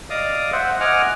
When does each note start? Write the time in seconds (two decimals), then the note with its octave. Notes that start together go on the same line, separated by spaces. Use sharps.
0.10 D5 D#5 F5 D6 D#6
0.53 C5 E5 F#5
0.80 D#5 F#5 G#5 D6 F6